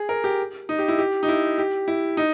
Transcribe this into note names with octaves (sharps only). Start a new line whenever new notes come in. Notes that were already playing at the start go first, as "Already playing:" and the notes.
Already playing: G#4
A#4
G4
D#4
G4
E4
G4
D#4
E4
G4
E4
D#4